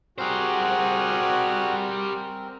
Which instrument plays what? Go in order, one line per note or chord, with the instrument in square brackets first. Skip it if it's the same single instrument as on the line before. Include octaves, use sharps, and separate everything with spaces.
[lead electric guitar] G3 C5 [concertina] C4 A#4 [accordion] F#4 [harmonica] G#4